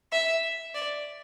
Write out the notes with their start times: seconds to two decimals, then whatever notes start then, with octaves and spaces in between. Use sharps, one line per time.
0.12 E5
0.74 D5